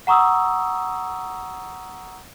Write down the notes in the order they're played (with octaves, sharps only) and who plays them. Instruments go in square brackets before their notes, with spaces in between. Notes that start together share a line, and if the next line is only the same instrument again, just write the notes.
[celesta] F#5 A#5 C#6 D#6 E6